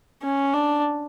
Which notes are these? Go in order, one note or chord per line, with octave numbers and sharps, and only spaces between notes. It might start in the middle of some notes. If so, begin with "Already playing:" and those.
C#4
D4